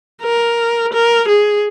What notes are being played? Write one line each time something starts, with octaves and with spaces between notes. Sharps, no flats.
A#4
A#4
G#4